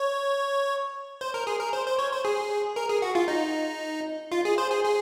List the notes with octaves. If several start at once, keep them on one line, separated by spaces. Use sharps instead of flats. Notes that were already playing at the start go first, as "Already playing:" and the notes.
Already playing: C#5
C5
A#4
G#4
A#4
C5
C5
C#5
C5
G#4
A#4
G#4
F#4
F4
D#4
F4
G#4
C5
G#4
G#4